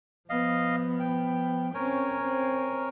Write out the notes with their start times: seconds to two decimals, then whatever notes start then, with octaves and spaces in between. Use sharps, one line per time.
0.30 F3 B3 D#5 F5
1.00 G5
1.74 C4 C#4 A#4 C#5 G#5
2.22 C4